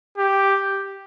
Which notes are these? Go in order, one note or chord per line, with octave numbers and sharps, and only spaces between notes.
G4